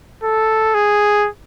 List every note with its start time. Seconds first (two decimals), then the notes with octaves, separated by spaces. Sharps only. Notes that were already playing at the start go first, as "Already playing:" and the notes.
0.23 A4
0.74 G#4